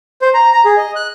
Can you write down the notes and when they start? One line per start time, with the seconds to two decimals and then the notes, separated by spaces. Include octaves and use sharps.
0.22 C5
0.34 A#5
0.53 A#5
0.65 G#4
0.77 D#5
0.96 F#6